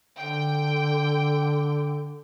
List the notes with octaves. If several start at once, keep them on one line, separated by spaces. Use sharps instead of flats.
D3 G5